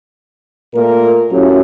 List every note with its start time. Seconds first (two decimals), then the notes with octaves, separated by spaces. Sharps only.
0.74 A#2 A3 A#3 A#4
1.31 F#3 A3 C#4 E4 F4 G4